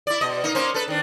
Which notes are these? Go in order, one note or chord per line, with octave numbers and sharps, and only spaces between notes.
E4 D5
B2 D#5
A#3 D#4
A#3 C#4 C5
A4 B4
D#3 D4